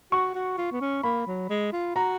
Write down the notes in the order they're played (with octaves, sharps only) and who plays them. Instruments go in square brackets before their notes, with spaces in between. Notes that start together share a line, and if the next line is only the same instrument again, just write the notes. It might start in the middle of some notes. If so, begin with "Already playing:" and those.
[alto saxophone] F#4 [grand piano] C#6
[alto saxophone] F#4
F4
B3
C#4
[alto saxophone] A#3 [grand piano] B5
[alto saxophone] F#3
G#3
F4
[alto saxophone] F#4 [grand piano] A#5